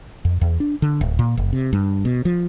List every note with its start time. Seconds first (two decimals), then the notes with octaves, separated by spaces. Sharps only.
0.25 F2
0.41 E2
0.60 D4
0.82 D3
1.01 D1
1.19 A#2
1.37 F#1
1.53 C3
1.73 G2
2.05 B2
2.25 F3